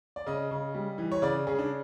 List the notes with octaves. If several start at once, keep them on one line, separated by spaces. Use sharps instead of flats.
D5
C#3 D#5
C#3
G3
E3
C#5
C#3 D5
C#3 G#4
D4